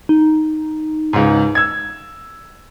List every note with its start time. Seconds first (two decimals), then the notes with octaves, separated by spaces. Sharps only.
0.09 D#4
1.13 C#2 G#2
1.55 E6 G#6